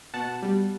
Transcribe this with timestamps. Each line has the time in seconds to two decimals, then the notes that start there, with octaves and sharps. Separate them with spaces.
0.14 B2 F#5 A5
0.42 G3